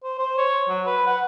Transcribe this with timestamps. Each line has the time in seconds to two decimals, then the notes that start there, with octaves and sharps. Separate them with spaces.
0.03 C5
0.19 C5
0.38 C#5
0.69 F#3
0.86 B4
1.06 F#5